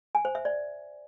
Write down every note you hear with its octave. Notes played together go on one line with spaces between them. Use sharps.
G#5
C5
E5
D5